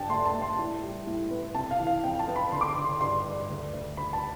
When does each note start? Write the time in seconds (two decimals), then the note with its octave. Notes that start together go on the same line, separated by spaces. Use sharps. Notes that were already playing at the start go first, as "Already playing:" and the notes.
Already playing: G2 D4 G5 A5
0.09 A3 C6
0.25 A5
0.34 A3
0.42 C6
0.59 A2
0.83 G3
1.07 A2
1.31 B3
1.55 C3 A5
1.71 F5
1.80 E3
1.87 F5
2.03 F2 G5
2.19 A5
2.28 B3
2.36 B5
2.52 D3 C6
2.61 D6
2.68 C6
2.76 D3
2.84 C6
3.00 G2 C6
3.24 G2
3.49 D2
3.73 D2
3.97 D2 B5
4.13 A5